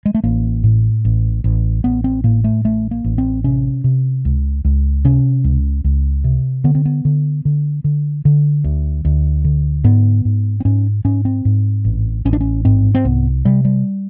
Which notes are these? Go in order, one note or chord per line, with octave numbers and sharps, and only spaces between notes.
G#3
A3
A1 A#3
A2
A1
A1
A1 B3
C4
A2 A#3
A3
A1 A3
A#3
A1
C4
C3 C#4
C3
C#2
C#2
C3 C#4
C#2
C#2
C3
D3 B3
C4
B3
D3
D3
D3
D3
D2
D2
D3
G#2 B3
G#2
C4
G#2 C#4
G#2 C#4
C4
G#2
A1
A1 C#4
D4
C#4
G#2 C4
C4
C2 B3
C3 G3
G3